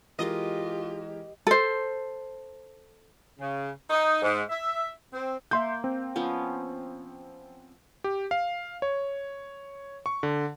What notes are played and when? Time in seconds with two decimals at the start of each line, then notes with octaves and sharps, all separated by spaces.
0.19 E3 G#3 F4 G4 A#4 D#5
1.47 A4 C5
3.39 C#3
3.90 D#4
4.22 G#2
4.49 E5
5.13 C4
5.51 A#3 E5 C6 G6
5.84 C4
6.16 F3 B3 C#4
8.04 G4
8.31 F5
8.82 C#5
10.06 C#6
10.23 D3